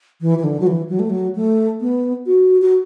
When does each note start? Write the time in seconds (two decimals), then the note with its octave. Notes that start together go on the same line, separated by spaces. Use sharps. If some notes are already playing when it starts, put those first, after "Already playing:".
0.21 E3
0.38 E3
0.44 D3
0.60 F#3
0.67 E3
0.90 F#3
0.99 A3
1.10 F#3
1.35 A3
1.81 B3
2.26 F#4
2.62 F#4